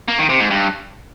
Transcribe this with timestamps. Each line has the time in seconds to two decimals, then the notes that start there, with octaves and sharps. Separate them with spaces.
0.08 A#3
0.19 D#3
0.29 C3
0.40 G#2
0.51 G2